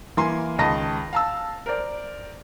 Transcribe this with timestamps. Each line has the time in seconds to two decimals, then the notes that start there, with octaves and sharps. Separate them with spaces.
0.17 E3 A#3 G#5 C6
0.58 C#2 D#3 D#5 A5 B5 A#6
1.13 F5 A5 E6
1.66 A#4 C5 D5